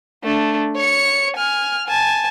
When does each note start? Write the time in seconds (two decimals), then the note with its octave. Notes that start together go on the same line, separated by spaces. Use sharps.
0.24 A3 D4
0.76 C#5 C#7
1.37 G#5 F6
1.88 G#5 A5